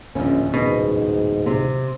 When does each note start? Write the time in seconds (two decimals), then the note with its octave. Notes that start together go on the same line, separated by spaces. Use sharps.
0.15 D1 A#1 E2 C#4
0.54 G#2 B2
1.46 C3